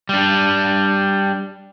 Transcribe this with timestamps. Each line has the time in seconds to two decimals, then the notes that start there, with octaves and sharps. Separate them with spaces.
0.09 G3 D4